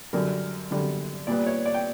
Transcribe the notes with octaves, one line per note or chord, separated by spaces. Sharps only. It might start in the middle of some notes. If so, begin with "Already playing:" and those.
F#2 D3 G3 A#4
F#2 D3 G3
A#2 G3 B3 D5
C#5
D5
G5